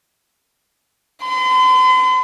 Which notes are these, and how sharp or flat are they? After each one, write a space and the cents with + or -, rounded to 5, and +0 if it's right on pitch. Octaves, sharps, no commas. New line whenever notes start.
C6 -45